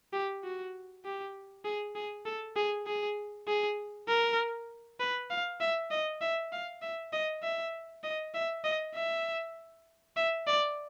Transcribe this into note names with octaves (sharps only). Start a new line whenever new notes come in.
G4
F#4
G4
G#4
G#4
A4
G#4
G#4
G#4
A#4
B4
F5
E5
D#5
E5
F5
E5
D#5
E5
D#5
E5
D#5
E5
E5
D5